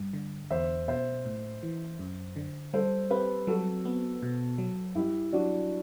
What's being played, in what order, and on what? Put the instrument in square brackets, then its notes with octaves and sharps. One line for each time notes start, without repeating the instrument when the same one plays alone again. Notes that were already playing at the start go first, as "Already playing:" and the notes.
Already playing: [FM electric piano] G2
D3
[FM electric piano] E2 [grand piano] C5 E5
[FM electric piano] B2 [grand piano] C5 E5
[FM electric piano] A2
E3
F#2
D3
[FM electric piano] G3 [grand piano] A4 C5
[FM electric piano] C4 [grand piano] G4 B4
[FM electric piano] F#3 [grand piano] F#4 A4
[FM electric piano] B3
B2
F#3
[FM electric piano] G2 [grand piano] E4 G4
[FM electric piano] F#3 [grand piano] D4 F#4